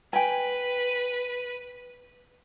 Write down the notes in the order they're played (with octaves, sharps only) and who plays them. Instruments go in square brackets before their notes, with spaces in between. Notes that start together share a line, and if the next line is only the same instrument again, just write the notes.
[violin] B4 [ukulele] G5 G#5